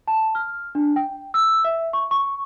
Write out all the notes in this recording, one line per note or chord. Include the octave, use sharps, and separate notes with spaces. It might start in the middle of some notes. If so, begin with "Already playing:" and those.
A5
F6
D4
G5
E6
E5
C#6
C#6